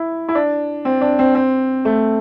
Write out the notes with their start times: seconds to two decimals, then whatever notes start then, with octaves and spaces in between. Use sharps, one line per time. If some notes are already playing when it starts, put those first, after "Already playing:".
Already playing: E4
0.28 E4
0.35 D4
0.85 C4
1.01 D4
1.19 C4
1.35 C4
1.85 A3